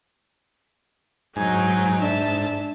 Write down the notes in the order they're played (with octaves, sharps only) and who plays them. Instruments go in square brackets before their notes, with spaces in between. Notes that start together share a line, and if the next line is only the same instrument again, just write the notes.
[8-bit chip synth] G#2 [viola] F#3 D#4 [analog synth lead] G#5
[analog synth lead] D4 [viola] E5 A5